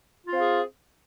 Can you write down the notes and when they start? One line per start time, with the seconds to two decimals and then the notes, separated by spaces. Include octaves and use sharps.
0.25 F4
0.30 C4
0.35 F5
0.40 G#4